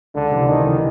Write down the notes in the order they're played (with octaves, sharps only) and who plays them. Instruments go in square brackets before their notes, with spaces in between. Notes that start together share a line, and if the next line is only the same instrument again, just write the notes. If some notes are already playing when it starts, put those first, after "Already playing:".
[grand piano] C#2 [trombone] D3
[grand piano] C3 E3
[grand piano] C#2 [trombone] D#3
[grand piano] C3 E3